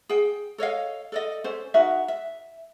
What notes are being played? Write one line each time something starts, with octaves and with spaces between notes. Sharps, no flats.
G#4 G5
A4 C#5 D#5 F5
A4 D5 D#5
C#4 A4 C5
D#4 F#4 A#4 E5
E5